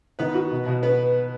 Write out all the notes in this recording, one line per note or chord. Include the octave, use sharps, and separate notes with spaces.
D#3 B3 B4
F#4
B2
B2
B3 B4